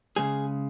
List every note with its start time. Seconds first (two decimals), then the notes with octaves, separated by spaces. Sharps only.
0.16 C#3 G#3 G#4